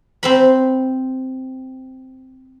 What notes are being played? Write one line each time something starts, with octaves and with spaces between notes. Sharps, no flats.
C4 C5 B5